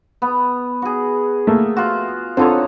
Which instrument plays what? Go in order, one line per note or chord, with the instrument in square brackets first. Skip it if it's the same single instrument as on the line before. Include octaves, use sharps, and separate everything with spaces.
[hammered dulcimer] B3
F#4 G#4
[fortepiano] A3 A#3
[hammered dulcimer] F4 F#4
[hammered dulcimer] D3 D#4 C#5 [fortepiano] C4 F4 A4